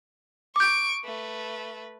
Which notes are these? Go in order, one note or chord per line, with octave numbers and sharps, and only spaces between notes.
C#6 D6 G6 D7
A3 B4